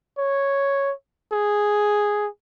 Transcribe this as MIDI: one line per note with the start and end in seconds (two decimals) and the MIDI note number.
0.18 0.93 73
1.32 2.28 68